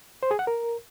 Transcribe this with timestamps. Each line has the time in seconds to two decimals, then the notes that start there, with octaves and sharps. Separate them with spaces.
0.23 C5
0.31 G#4
0.39 F#5
0.47 A#4